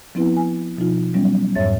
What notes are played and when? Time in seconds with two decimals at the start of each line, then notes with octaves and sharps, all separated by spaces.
0.15 F3 B3 C4 E4 B4
0.37 G#5
0.78 B2 F3 D#4 F4
1.14 F#3 G3 B3 C#4
1.55 F2 G#2 C#5 E5 A6